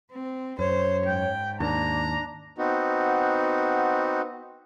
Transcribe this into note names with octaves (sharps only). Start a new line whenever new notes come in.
C4
F#2 C5 C#5
G#2 G5
D#2 D4 A#5
B3 C4 D#4 F#4